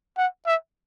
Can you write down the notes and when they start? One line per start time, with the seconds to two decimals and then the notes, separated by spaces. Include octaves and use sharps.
0.18 F#5
0.47 E5